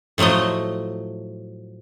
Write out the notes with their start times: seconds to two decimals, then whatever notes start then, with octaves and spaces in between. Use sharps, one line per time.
0.18 A2 F3 F#3 A3 D#5